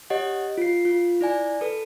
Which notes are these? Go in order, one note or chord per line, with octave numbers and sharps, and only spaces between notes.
G4 C#5 D#5 F#5
F4 C7
F4
E4 D5 G#5
A4 B4